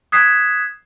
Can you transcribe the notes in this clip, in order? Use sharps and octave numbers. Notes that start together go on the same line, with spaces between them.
D#6 F#6 G#6 B6 C7 E7